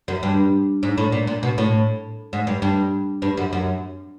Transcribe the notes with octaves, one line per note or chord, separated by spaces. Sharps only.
F#2
G2
G#2
A2
A#2
A#2
B2
A2
G#2
G2
G2
G2
F#2
F#2